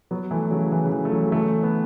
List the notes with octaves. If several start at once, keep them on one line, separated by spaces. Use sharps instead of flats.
F#3 B3
E3 A3
C#3 F#3
E3
C#3
E3
A3
C#3 F#3
E3 A3
B3